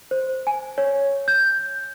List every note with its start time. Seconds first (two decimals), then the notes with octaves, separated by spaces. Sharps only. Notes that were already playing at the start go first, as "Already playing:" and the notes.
0.11 C5
0.47 G#5
0.78 C#5
1.28 G6